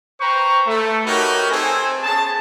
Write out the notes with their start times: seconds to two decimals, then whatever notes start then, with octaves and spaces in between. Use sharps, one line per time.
0.20 B4 C5 G5 A#5 C#6
0.67 A3
1.06 D#4 F#4 G4 A#4 B4 C#5
1.51 C4 G#4 A4 C5 G#5
2.04 B3 C#4 G#4 A5